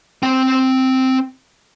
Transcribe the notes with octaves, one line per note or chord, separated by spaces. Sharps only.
C4 G5